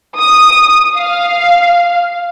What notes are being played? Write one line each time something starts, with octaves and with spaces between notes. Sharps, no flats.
D#6
F5